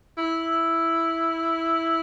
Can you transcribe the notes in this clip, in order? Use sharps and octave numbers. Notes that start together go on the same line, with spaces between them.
E4